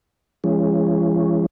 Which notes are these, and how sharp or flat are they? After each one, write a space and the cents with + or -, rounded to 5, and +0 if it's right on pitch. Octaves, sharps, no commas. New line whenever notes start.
E3 +45 G#3 -20 C#4 +0